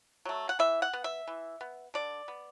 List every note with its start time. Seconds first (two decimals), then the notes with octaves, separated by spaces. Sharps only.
0.25 F#3 A3
0.49 F#5
0.59 E3 E5
0.82 F#5
0.93 B3
1.04 E5
1.28 E3
1.61 B3
1.94 D3 D5
2.28 B3